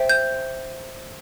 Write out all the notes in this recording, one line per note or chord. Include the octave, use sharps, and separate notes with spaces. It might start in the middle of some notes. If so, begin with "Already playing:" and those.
Already playing: C5 E5 G5
G6